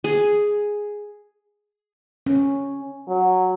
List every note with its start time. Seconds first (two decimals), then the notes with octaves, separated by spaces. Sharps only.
0.04 G#4
2.26 C#4
3.08 F#3